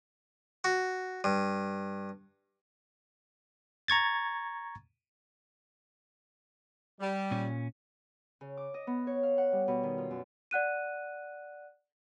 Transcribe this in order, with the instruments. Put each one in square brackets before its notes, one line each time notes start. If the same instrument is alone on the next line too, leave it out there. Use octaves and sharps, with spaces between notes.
[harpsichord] F#4
G2
[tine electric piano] A#5 C#6 G#6 A6
[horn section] G3
[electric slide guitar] A#2 C#4
[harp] C#3
D6
D#5
B3
C#5
F5
F#5
G3
B2
D#3
F4
F#2
[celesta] D5 F#5 F#6 D#7